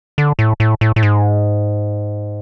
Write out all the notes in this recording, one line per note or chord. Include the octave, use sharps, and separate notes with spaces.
D3
A2
A2
A2
A2
G#2